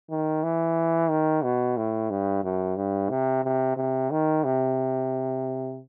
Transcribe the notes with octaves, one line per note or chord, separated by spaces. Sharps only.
D#3
E3
D#3
B2
A2
G2
F#2
G2
C3
C3
C3
D#3
C3